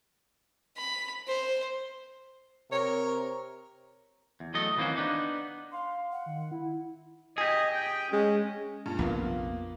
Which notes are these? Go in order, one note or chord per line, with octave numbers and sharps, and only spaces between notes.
B5
C5
C3 A#4 C#5
E2
E2 F#3 A3 A4 D#5
D#3 E3 A#3 C4 C#4 F#4
B3 D4 D#4
F5 C6
F#5
D#3
E4
G4 G#4 D#5
G5
G#3 C#4
G2 A#2
A#1 F2 C3 A#3 B3 F4